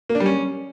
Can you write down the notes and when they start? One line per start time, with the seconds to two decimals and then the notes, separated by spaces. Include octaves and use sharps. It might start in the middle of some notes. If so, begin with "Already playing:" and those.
0.09 A#3
0.15 D4
0.20 G3
0.26 C#4